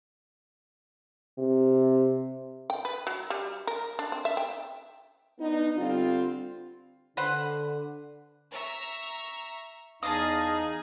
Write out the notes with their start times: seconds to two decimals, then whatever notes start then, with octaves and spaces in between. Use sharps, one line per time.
1.38 C3
2.70 G5
2.85 B4
3.07 F#3
3.30 G3
3.67 A#4
3.99 D4
4.12 C4
4.25 E5
4.37 G5
5.39 B3 D4 D#4
5.76 D3 G3 C4 F4
7.17 D3 B4 C5 F#5
8.50 E5 A#5 C#6
10.03 E2 D#4 G#4 D#5 F5 A5 D#6